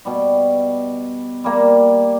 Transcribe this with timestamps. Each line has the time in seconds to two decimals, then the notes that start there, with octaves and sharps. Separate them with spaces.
0.05 B2 G3
1.44 G3 A#3